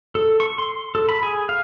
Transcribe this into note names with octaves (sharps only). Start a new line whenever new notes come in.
A4
C#6
C6
A4
B5
G#4
F5